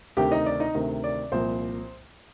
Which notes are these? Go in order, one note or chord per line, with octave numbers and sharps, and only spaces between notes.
D2 C3 D#3 G4 G5
D#4 D#5
D5
D#4 D#5
D2 C3 D#3
D5
C2 A#2 F3 C5